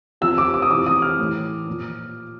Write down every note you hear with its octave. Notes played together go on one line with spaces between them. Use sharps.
C3 F3 E6
D6
D6
D#6
C3 E3 D6
D#6
F6
A2 E3
A#2 F3